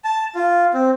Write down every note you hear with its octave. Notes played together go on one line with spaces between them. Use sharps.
A5
F4
C4